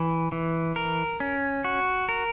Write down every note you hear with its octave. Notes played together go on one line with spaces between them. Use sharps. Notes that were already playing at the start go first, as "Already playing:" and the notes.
Already playing: E3
E3
A#4
C#4
F#4
A#4